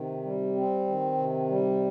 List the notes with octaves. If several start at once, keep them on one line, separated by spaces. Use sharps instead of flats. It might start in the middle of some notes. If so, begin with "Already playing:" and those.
Already playing: C3 D#3
G3
C4
D#3
C3
G3